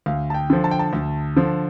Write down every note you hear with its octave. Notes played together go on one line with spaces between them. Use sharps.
D2 F5
A5
G5
D3 F3
A5
G5
A5
D2
D3 F3